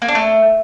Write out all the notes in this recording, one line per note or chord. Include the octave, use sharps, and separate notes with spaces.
A#3
D4
A3